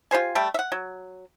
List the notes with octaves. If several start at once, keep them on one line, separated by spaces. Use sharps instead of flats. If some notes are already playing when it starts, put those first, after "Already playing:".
F4 G4 C5 G#5
G3 A3 G5
E5 F#5
F#3